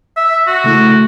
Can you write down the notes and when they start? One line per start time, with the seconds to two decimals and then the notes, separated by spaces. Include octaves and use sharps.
0.17 E5
0.47 F#4
0.64 C#3 A3 E4